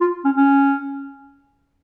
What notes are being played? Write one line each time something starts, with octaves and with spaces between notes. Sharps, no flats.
F4
C#4
C#4